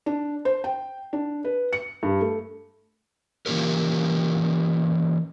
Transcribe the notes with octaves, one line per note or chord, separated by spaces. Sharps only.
D4
C5
G5
D4
B4
C#7
G2
A3
E3 F3 A#3 C#4 G4 A#4